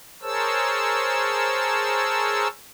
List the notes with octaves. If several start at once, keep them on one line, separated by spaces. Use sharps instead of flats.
G#4 A#4 C5 C#5 A5 E6